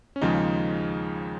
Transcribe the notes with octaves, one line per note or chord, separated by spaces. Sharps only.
C#4
D#2 C#3 F3 G#3 D#4